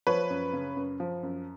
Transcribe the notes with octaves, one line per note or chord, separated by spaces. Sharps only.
F3 B4 C#5
F#2
C#3
F#2
F3
F#2